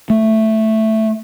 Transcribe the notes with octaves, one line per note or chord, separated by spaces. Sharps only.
A3